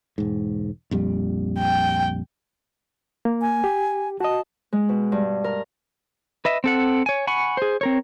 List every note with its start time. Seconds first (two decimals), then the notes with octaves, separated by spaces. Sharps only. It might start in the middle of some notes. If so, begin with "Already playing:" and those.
0.18 E1 G#2
0.91 A#1 F2 G3
1.59 G5
3.25 A#3
3.41 G#5
3.64 G4
4.20 F#4 D#5 A5
4.73 G#3
4.89 B2
5.12 G2
5.44 A#4
6.45 B4 D#5 E5
6.64 C4 A4 F#5
7.06 C#5 G#5
7.27 F#5 G#5 B5 C#6
7.57 G#4 C5
7.81 C4 A#4 C#5